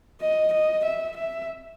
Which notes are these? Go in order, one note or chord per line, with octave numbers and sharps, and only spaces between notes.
D#5
D#5
E5
E5